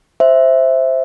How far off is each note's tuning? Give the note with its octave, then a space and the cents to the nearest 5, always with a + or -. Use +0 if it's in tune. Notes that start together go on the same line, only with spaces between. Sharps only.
C5 +0 E5 +0